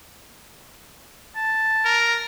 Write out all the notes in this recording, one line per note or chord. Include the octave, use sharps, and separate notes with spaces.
A5
A#4